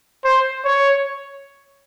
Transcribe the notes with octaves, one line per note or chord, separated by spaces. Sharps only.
C5
C#5